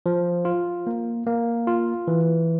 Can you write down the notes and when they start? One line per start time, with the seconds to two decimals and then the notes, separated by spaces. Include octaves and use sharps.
0.06 F3
0.45 F4
0.87 A#3
1.27 A#3
1.67 F4
2.07 E3